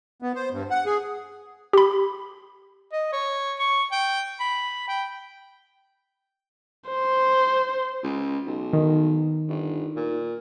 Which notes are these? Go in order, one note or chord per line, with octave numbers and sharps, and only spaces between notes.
B3
C5
G2
F#5
G#4
G4 B5
D#5
C#5
C#6
G5
B5
G5
C5
C#2
B1
D#3
G1
A#2